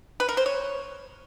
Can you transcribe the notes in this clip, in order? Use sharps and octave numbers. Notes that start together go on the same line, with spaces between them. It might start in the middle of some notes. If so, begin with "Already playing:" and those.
B4
A#4
C5
C#5